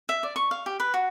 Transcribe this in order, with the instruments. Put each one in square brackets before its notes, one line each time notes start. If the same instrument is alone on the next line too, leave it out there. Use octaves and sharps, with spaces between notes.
[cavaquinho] E5
D5
C#6
F5
G4
B4
F#4